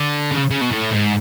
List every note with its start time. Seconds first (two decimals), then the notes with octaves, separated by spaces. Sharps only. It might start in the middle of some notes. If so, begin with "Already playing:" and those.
Already playing: D3
0.31 C#3
0.50 C#3
0.61 B2
0.71 A2
0.91 G#2